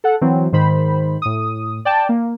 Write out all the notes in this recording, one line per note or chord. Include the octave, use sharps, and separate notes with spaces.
A4 F#5
E3 F#3 C4
G#2 D#3 C5 B5
A2 D#6
D5 G5 A5
A#3